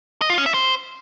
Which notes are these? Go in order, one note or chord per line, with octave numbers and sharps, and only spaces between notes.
D#5
F4
C#4
E5
C5